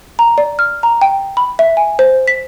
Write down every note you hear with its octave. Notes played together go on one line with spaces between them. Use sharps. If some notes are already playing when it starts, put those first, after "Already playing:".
A#5
D5
F6
A#5
G5
B5
E5
G#5
C5
B6